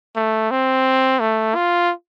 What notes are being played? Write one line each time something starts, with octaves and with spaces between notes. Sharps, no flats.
A3
C4
A3
F4